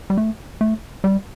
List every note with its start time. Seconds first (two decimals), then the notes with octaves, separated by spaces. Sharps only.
0.10 G3
0.17 A3
0.61 A3
1.04 G3